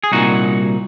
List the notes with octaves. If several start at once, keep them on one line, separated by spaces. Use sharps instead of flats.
G#4
C2 A#2 D#4 F#4